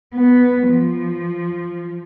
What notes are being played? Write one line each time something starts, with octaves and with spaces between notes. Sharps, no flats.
B3
F3